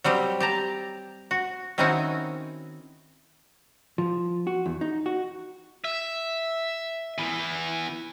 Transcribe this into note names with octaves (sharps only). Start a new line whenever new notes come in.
F#3 G3 C4 G4
G4 A5 A#5
F#4
D#3 C4 C#4 D#4 E4 F#4
F3
F#4
E2
D#4
F#4
E5
E3 B3